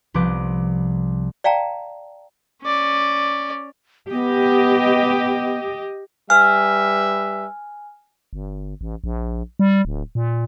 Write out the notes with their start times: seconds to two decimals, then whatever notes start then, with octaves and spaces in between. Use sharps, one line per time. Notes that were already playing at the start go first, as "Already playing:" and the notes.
0.14 C2 F3 B3 B4 D6 G6
1.44 D5 F5 G5 A5 A#5
2.63 C#4 D5
4.11 B3 G4 D#5
6.30 G3 B4 E5 G#5 F6
8.33 G1
8.81 A1
9.04 A#1
9.59 G3
9.85 D1
10.15 A#2